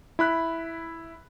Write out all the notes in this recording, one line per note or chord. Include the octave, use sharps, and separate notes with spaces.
E4 B5 F#6